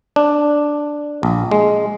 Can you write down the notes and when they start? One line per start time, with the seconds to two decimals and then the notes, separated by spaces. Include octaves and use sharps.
0.16 D4
1.23 A#1
1.51 G#3